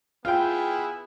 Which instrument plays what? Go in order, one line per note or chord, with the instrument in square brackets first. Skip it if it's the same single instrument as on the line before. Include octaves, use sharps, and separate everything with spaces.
[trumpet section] B3 E4 G#4 [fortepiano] F4 G5